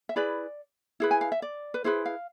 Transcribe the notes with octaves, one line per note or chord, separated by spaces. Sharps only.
E5
E4 G#4 B4 D5
E4 G#4 B4
G#5
F5
E5
D5
B4
E4 G#4 B4 C5
F5